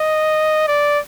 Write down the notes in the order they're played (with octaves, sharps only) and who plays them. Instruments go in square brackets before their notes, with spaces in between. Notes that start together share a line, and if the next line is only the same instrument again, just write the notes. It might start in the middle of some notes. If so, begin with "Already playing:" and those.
Already playing: [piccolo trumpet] D#5
D5